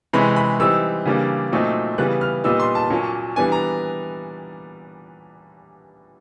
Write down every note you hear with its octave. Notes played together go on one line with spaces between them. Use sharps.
C3 E3 G#3 C#4 B5
B5
E3 G3 C4 D#4 E6
C#3 E3 G3 A#3 D4
A#2 F#3 A3 C4 D#4
C#3 E3 G3 B3 F#6
F6
A#2 G3 B3 D#4 E6
C6
A5
A#2 F#3 A#3 C#4
E3 G3 B3 D4 G#5
A#5